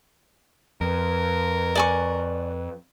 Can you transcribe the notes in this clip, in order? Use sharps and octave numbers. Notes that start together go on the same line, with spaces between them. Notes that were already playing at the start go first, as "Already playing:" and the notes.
F2 A#4 B4
D5 G#5 C#6